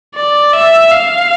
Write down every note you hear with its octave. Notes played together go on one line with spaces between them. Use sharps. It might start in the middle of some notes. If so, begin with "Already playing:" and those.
D5
E5
F5